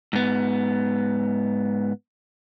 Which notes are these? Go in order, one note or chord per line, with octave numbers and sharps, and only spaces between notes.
G#2 B3